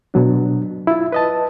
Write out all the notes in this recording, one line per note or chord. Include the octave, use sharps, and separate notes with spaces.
B2 F#3 D4
E4 F4
B4 D#5 A5